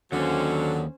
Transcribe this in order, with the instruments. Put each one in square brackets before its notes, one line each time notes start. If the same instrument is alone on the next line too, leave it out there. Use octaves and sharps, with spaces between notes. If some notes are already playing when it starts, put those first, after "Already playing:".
[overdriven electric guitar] D#2 [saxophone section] D3 F#3 [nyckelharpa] C#4 C5